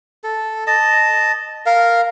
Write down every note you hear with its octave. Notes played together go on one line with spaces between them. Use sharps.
A4
D#5 A5
A#4 F5